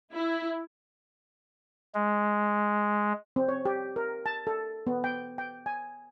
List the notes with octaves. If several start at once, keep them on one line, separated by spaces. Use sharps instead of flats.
E4
G#3
C4
C#5
G4
A#4
A5
A4
B3
G5
G5
G#5